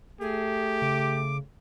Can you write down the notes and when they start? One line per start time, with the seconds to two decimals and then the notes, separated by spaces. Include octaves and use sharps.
0.21 A3 G4 G#4
0.82 C#3 D6